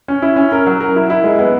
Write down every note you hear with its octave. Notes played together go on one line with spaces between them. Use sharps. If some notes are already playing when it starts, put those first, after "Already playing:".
C#4
E4
C#4
A#4
F#3
A#4
E4
E4
G#3
B3